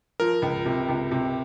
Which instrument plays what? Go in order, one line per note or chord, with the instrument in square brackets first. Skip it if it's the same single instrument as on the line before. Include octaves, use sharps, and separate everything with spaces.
[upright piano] F3 [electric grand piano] A#4
[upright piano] C#2
C3
C#2
C3